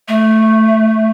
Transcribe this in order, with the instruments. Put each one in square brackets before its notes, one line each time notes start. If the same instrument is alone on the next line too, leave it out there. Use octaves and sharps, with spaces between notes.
[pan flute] A3